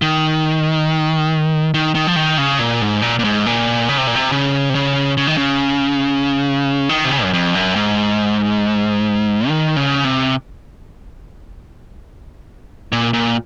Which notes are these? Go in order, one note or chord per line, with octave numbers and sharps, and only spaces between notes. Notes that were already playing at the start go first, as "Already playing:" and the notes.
D#3
D#3
D#3
F3
D#3
C#3
A#2
G#2
A#2
A#2
G#2
A#2
C#3
C3
A#2
C3
C#3
C3
C#3
C#3
D#3
C#3
D#3
C3
C#3
F#2
F2
F#2
G#2
D#3
C#3
C3
A#2
A#2